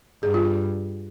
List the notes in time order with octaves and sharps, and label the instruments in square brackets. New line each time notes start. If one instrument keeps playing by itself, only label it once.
[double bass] G2 [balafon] G#4
[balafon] F4